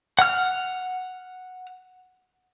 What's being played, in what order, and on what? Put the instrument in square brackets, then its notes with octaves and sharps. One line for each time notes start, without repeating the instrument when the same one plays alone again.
[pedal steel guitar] F#5 F6